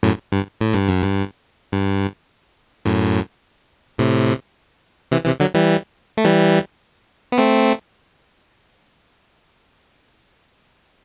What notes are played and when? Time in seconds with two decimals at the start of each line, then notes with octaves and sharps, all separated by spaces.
0.03 F#2 A2
0.32 G2
0.61 A2
0.74 G2
0.88 F#2
1.02 G2
1.72 G2
2.85 F#2 A2
3.98 A2 C3
5.11 C3 E3
5.26 C3 E3
5.40 D3 F#3
5.54 E3 G3
6.17 A3
6.24 E3 G3
7.32 B3
7.38 A3 C4